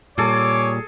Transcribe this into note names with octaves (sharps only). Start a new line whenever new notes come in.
A#2 G3 G#4 A4 C#5 D6